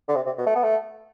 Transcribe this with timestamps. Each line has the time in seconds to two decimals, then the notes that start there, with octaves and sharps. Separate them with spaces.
0.09 D3
0.16 C3
0.26 C3
0.38 B2
0.47 A3
0.55 B3
0.63 A3